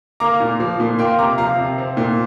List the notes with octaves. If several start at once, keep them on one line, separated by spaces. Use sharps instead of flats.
A#3 A#5 D6
A#2
F3
A#2
A#3 G5 C6
C3 A#5 D6
F3 F5 A#5
C3
C4
A#2